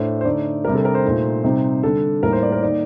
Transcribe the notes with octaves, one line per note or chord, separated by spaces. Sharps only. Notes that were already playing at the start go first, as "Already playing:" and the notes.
Already playing: A2 A3 D4 C5
C5
D3 A3 D#4 D5
C3 G3 D4 A#4
A4
A#4
C5
A#2 A3 D#4
C3 G3 C4 D#4
D3 G3 D4 A4
A2 G3 A#3 D#4 A#4
C5
D5
A#4
D#3 A#3 D#4 D5